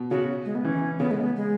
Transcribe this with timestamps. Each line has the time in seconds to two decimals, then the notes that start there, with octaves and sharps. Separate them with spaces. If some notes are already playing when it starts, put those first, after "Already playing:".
Already playing: B2
0.11 C#3 F#4
0.45 G#3
0.55 B3
0.64 E3 C#4
0.99 C#3 B3
1.11 G#3
1.20 B3
1.36 G#3